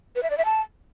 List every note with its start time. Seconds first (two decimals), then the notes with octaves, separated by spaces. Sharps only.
0.16 B4
0.23 E5
0.30 D5
0.38 E5
0.45 A5